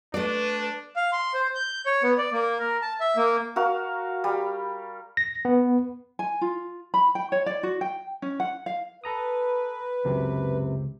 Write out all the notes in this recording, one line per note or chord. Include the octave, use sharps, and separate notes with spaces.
A3 D4 B4 D5
F5
C6
C5
G6
C#5
B3
D5
A#3
A#4
A5
E5
A#3
F#4 A#4 F5
G3
A#6
B3
G#5
F4
B5
G5
C#5
D5
F#4
G5
C#4
F#5
F5
A4 B4 A#5 D#6
C#2 F#2 C3